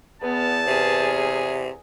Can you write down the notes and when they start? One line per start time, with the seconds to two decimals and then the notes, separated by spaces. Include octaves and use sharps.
0.22 E2 B3 A5
0.67 C3 G#4